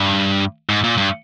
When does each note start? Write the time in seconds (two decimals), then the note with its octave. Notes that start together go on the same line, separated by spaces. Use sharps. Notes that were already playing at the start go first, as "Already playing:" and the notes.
Already playing: G2
0.69 G#2
0.84 A#2
0.98 G2